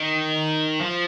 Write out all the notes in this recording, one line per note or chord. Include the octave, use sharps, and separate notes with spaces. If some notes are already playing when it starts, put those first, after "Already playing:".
Already playing: D#3
F3